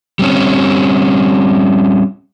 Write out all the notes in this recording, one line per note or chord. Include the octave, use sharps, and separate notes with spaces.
G3 C4 C#4